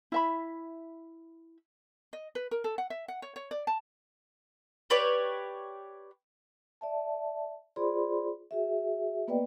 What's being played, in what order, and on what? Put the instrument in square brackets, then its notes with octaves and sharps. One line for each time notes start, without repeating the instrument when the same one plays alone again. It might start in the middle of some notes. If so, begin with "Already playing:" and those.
[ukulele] E4 E5 B5
D#5
B4
A#4
A4
F#5
E5
F#5
C#5
C#5
D5
A5
[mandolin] G4 B4 C#5 D5
[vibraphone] D5 E5 A5
F4 G#4 C5 D5 B5 C6
F#4 G#4 E5
A#3 B3 B4 D5 D#5 G5